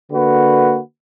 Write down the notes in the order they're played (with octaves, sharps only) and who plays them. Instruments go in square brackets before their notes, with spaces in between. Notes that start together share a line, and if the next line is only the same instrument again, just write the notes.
[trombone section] D3 A#3 F#4 B4